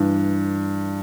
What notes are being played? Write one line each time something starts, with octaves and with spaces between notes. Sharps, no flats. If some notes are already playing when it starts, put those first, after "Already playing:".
Already playing: G2 E3